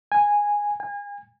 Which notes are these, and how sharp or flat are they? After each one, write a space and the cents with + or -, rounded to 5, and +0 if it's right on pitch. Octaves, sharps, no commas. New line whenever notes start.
G#5 -10
G#5 -35